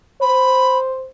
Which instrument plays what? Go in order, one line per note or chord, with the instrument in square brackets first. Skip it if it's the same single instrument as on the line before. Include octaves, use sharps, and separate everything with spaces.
[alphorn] C5 [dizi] B5